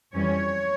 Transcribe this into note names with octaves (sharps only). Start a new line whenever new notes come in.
F2 E3 G3 C#4 C#5